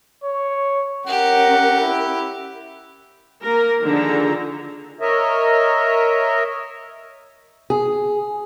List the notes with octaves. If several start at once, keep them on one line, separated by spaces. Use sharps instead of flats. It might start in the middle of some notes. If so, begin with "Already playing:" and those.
C#5
C#4 G4 A#4 F#5
E4
A#3 A#4
D3 D#3 F3 G#4 A4 A#5
A#4 C#5 D#5 E5
G#4